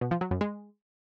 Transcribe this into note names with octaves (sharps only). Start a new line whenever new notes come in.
B2
F3
F#3
F#2
G#3